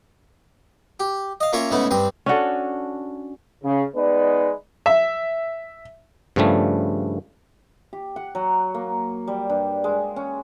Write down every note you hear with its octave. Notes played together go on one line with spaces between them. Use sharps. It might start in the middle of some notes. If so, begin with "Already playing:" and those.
G4
D#5 F5
A#3 C#4 F4 A#4 C#5 E5
G#2 C#3 A3 B3 C#4 E4
G2 G3 C4 D#6
C#4 D4 F#4 A4
C#3
G#3 B3 D#4 B4 D5
E5
G2 C#3 F3 G3 A3
G4
F#5
F#3
A#3
G3
G2
G#3
C#4